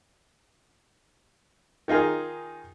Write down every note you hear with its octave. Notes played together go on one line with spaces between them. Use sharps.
D#3 D#4 F4 G#4